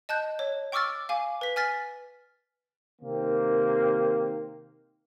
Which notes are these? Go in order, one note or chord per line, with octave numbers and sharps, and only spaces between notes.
D#5 A5 F#6 G6
C#5
G5 C#6 D6 E6 F6 A6
F5 G#5 D6
B4 B6
G#5 F6 A6 B6
C3 D#3 A#3 C4